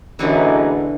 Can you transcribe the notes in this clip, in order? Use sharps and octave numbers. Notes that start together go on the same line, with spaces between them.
A1 F#2 B2 D3 E3 F#3 D#4 G#4